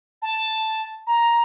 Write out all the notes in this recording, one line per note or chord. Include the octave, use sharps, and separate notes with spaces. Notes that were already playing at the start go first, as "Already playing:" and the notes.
A5
A#5